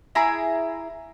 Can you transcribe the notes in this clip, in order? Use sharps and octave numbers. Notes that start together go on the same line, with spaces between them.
E4 G#4 A#5 B5